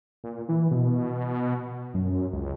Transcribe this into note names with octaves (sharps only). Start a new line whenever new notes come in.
A#2
E3
B2
F#2
C#2